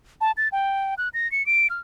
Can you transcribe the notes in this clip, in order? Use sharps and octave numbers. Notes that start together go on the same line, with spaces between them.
A5
A6
G5
F#6
A#6
C#7
D7
F6